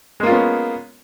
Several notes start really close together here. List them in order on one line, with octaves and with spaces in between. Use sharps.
G#3 A#3 F4 C#4 B3